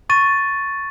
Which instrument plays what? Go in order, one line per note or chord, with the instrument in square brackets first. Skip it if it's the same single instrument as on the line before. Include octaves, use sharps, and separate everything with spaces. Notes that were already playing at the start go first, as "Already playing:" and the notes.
[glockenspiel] C#6 A6 D#7